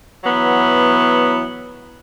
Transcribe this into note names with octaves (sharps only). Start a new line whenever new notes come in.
E3 F#3 B3